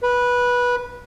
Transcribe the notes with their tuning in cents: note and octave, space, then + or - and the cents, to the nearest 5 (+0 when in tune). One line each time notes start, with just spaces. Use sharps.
B4 -15